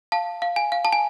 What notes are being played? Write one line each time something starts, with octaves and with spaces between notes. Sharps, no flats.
F5 A5
F5
G#5
F5
A5
G#5